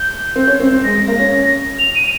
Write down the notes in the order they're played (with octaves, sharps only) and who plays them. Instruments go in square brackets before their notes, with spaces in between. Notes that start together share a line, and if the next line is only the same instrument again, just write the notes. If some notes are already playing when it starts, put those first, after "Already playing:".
Already playing: [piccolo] G6
[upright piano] C4
C#4
C4
C4
[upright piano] G#3 [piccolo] A#6
[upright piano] G#3
A#3
C#4
[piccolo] F7
D#7